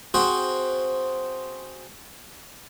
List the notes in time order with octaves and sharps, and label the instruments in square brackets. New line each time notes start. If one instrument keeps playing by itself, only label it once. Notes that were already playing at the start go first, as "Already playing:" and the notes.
[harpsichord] C4 F#4 G#4 C5